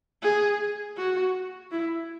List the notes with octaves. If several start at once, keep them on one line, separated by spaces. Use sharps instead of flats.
G#4
F#4
E4